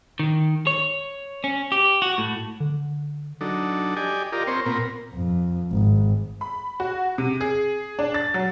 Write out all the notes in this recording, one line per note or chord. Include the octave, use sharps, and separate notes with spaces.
D#3
C#5
C#4
G4
F#4
A2
D3
F#3 D4 D#4 A4
G4 D5 D#5 G#5
F4 G4 A#4 D5 D#5
C4 A#4 C5 C#5
A#2 B3 C4 A#4
F2
G#1
B5
F#4
C3
G#4
D4
A6
F#3